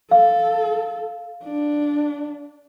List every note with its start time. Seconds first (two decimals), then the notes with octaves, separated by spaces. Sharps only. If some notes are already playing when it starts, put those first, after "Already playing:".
0.11 A4 F5
1.44 D4